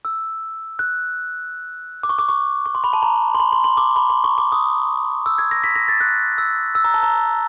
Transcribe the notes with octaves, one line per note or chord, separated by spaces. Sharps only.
E6
F#6
D6
C#6
D6
C#6
C#6
C6
B5
A5
A#5
C6
B5
C6
C6
D6
B5
C6
C#6
D6
D#6
E6
G#6
A#6
B6
A#6
A6
F#6
E6
E6
A#5
A5
A#5